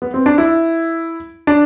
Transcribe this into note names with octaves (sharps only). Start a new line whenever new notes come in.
B3
C4
D4
E4
D4